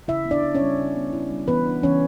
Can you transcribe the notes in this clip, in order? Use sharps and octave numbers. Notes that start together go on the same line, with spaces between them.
C#3 E4 E5
B3
D4 D5
E4
C#4 C#5
G3
C#3
B3
E4
G3
E3 B3 B4
D4
E3 C#4 C#5